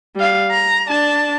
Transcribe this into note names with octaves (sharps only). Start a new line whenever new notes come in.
G3 F5
A#5
D4 A5